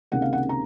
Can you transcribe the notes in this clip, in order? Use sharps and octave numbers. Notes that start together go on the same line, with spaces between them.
C#2 C3 D#3 A#3 F#5
F5
F#5
A#5